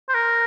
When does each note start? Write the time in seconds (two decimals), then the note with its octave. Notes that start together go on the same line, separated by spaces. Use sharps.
0.09 C5
0.15 A#4